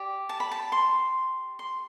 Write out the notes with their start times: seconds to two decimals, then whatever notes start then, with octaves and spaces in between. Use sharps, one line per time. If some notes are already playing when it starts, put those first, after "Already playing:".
Already playing: G4 D5
0.29 A5
0.40 B5
0.51 A5
0.72 C6
1.59 C6